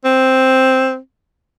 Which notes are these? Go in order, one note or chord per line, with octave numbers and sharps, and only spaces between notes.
C4